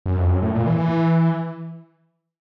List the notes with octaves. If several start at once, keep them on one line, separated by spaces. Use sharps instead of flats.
F#2
F2
F#2
A2
A#2
E3
E3